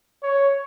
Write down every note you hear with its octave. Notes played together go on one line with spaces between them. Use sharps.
C#5